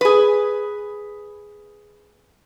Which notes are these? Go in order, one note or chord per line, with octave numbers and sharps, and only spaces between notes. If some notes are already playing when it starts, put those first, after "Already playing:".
G#4 B4